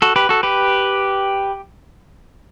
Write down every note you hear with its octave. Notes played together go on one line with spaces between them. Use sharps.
F#4 A4
G4 B4
F#4 A4
G4 B4